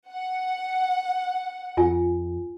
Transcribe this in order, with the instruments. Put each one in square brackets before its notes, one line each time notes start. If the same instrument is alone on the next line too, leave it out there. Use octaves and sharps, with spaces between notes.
[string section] F#5
[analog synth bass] F2 [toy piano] F4 G#5